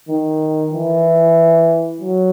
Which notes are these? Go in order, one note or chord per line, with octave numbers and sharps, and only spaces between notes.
D#3
E3
F#3